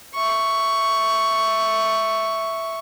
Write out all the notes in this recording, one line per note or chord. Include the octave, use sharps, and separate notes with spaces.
E5 C#6